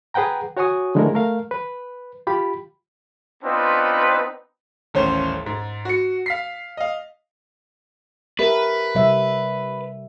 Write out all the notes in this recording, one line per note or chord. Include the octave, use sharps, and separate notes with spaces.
G#4 B4 F#5 G5 A#5
F#4 C#5 F#5 G#5 C#6 D#6
D3 F3 G#3 A3 E4 A#4
A3 A#4 F5
B4
F4 G4 B5
B3 C4 D4 D#4 F4 B4
D#1 A1 C#4 C5 C#5
G#2
F#4 C#7
F5 B6 C7
D#5 F5
G4 A#4 B4 E5
C3 G3 E5